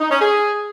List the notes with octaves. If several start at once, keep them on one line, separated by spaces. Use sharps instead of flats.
D#4
C#4
G#4